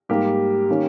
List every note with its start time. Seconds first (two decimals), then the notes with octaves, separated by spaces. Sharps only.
0.09 G#2 G3 A#3 G4
0.70 D#3 A#3 C#4